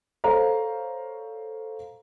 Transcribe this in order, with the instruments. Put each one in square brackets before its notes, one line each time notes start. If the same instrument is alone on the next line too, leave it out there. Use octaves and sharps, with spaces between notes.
[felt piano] A4 C5 C#5 F5 A#5